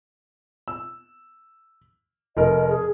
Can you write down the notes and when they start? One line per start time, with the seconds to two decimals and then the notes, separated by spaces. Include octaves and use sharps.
0.68 E6
2.37 F1 A#4 D#5
2.69 G#4